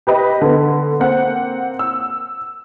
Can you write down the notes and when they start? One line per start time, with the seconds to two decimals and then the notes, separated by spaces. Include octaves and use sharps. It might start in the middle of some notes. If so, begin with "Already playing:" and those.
0.07 G4 B4 D#5
0.41 D3 B3
1.00 A#3 C4 F#5
1.79 E6